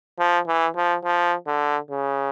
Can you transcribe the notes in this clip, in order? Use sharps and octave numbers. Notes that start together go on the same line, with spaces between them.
F3
E3
F3
F3
D3
C#3